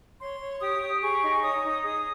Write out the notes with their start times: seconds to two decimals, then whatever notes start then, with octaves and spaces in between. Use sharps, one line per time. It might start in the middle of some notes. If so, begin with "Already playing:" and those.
0.20 C#5 C6
0.41 C#5
0.61 G4 D#6
0.82 G4
1.01 G#4 C#6
1.22 D#4
1.42 C#5 D#6
1.64 D#4
1.83 G#4 D#6